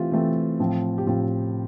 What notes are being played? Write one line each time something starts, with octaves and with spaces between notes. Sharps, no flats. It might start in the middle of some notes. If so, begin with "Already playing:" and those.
Already playing: E3 A3 C4 F4 G4
E3 A3 C4
A2 F3 C4
G4
A2 F3 C4 F4